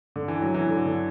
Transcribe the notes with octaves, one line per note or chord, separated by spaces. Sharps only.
D3
E3
F#3
E3
D3
D3